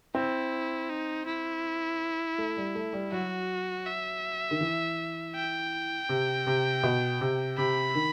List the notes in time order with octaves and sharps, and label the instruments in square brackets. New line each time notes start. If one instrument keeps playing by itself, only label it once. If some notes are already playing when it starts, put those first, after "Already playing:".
[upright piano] C4 [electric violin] E4
[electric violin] D#4
E4
[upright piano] A3
G3
A3
G3
[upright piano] F#3 [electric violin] F#4
[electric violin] E5
[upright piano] D#3
E3
[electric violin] G5
[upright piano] C3
C3
B2
C3
[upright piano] C3 [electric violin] B5
[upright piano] D#3